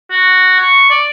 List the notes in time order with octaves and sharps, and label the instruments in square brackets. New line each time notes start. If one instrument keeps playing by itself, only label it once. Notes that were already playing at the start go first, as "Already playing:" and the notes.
[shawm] F#4
C#6
D5